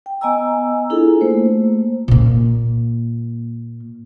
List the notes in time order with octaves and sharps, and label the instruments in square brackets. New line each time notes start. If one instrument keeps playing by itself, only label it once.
[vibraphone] G5
B3 D#5 G#5 A#5 E6
D4 E4 F4 G#4 A4
A3 A#3 C5
[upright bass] A#2 A#3